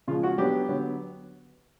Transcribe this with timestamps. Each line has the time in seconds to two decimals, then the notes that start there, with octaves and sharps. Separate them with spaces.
0.08 C#3 F3 G#3 F4
0.23 F#4
0.38 F#3 B3 D4 G4
0.69 D3 F#3 B3